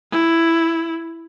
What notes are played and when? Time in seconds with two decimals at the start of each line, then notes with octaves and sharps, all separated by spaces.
0.11 E4